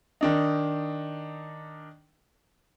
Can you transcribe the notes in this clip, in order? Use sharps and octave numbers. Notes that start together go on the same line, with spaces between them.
D#3 D4 D#4